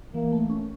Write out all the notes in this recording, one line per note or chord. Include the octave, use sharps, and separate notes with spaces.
E3 A#3
A3
C#4